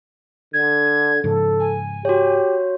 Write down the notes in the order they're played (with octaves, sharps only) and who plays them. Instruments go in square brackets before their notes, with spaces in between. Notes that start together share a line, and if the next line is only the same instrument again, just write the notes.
[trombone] D3 [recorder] G#6
[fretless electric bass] G#2 C#3 F3 [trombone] A4
[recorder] G#5
[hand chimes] F#4 C#5 [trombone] G4